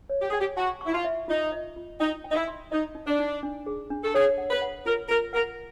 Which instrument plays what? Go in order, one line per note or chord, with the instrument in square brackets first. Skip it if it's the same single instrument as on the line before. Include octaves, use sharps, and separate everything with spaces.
[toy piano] C#5
[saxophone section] G4
[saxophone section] G#4 [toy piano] G5
[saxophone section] G4
[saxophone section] F#4 [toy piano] A5
[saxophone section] E4 [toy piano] C#6
[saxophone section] F4
[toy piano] E5
[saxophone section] D#4 [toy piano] F4
[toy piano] D#5
F4
[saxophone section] D#4 [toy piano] G5
[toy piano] G5
[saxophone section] D#4
E4
[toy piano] C6
[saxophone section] D#4 [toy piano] D#5
[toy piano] D#4
[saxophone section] D4
[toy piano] D#4
D4
G#4
D4
[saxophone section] A4
[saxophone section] G#4 [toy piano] C#5
[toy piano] F#5
[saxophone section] B4
[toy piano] F#5
[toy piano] F4 [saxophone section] A#4
[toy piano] F4 [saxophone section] A#4
[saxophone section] A#4 [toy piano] F#5